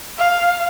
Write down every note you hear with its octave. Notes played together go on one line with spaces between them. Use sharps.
F5